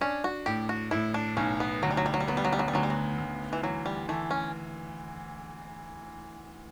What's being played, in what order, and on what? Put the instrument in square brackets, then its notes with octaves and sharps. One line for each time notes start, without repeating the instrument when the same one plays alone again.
[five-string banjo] C#4 [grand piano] D4
[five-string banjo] F#4
[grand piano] A2 [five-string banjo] G4
[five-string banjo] F#4
[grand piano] A2 [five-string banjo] E4
[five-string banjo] D4
[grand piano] B1 [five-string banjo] C#4
[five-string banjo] B3
[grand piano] D2 [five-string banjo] F#3
[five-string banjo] G3
F#3
G3
F#3
G3
[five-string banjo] F#3 [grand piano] B3
[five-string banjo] G3
F#3
G3
F#3
G3
[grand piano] D2 [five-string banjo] F#3
[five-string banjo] G3
F#3
[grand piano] D2
[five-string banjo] E3
[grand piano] E3 [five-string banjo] F#3
[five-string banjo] G3
[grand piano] E3 [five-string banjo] A3
[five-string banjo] C#4